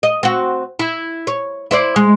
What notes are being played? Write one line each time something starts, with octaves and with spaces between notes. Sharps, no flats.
D#5
C4 F#4
E4
C#5
E4 C5 D5
G#3